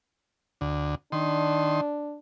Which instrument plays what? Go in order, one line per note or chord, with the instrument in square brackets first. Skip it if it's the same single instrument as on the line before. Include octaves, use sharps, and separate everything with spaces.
[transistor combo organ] D2
[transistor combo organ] D#3 C6 [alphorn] D4